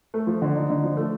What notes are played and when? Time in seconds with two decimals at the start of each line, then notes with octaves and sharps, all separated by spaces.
0.14 A3
0.27 F3
0.42 D3
0.55 D#4
0.70 D3
0.84 F3
0.97 A3